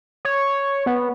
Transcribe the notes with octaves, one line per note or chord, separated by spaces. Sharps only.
C#5
B3